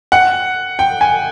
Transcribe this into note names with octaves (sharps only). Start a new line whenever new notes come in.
F#5
G5
G#5